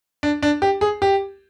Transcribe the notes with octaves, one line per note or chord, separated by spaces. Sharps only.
D4
D4
G4
G#4
G4